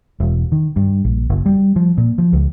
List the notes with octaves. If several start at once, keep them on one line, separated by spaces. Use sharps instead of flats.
E1
D#3
G2
A#1
F#1
G3
F3
A#2
F3
C#2